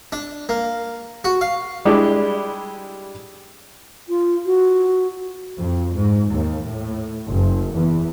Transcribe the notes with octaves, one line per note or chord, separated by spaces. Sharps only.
D4
A#3
F#4
F5
G3 G#3 D4 E4 G4
F4
F#4
F2
G#2
D#2
A2
F#1
E2